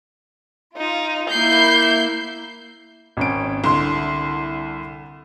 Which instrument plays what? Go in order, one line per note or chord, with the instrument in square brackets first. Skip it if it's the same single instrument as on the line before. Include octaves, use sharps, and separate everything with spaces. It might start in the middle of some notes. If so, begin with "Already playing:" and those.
[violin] D#4 [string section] F4
[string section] A#3 E4 [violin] G6 C7
[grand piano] G#1 C#4 D7
[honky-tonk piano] C2 C6 [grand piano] D3